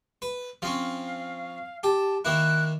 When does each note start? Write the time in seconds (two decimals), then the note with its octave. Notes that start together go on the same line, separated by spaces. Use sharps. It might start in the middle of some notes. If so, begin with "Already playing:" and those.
0.22 B4
0.62 F3 C4 C#4 F5
1.83 G4 A5
2.25 D#3 A#3 E4 F#6